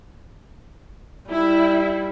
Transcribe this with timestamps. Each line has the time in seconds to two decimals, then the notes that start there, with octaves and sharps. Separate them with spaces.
1.30 G3 E4